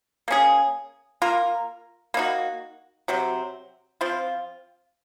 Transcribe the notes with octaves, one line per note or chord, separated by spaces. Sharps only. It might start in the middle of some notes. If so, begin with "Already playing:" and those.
A#3 C#4 G#4
A#3 F4 A#4
A#3 D#4 F#4
C3 F#3 C4
F3 C4 F4